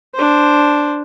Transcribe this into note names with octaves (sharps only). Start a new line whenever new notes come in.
D4 C5